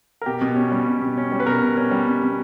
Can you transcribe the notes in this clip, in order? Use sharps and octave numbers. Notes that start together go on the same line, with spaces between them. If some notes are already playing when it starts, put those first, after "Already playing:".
A#4
B2 G4
B2
C#4
G3
B2
B2
C#4
G3
B4
B2 A#4
B2
C#4
G3
B2
B2